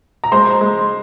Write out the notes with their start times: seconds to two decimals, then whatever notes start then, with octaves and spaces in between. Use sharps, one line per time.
0.24 A#5
0.32 G#3 C5 C6
0.61 G#3